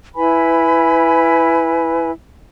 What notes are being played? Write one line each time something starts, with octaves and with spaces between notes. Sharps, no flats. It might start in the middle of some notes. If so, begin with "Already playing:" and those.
E4 B4 G#5 B5